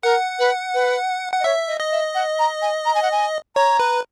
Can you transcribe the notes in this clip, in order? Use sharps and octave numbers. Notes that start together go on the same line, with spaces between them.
A#4 F#5
B4
B4
F#5
D#5
C#5 E5
D#5
D#5
E5
F#5
A#5
G#5
A#5
G#5
F#5
G#5
C#5 A#5
B4